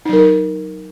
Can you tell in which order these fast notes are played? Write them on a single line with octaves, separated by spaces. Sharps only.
D#4 F#3 A#4